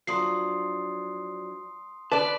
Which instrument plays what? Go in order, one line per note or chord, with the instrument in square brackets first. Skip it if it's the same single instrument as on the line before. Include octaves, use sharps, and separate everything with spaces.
[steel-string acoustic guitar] F3 F#3 D4 [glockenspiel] C6 D#6 C7
[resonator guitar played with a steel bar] B4 D5 [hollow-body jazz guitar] A5 [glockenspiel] D6